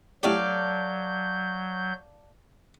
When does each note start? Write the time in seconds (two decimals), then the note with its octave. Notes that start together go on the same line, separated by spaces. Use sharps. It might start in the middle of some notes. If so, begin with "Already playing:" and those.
0.23 A2 F#3 C#4 G4 A4 D5 F5 G6